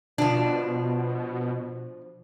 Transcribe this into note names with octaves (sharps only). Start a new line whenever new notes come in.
B2 F3 D4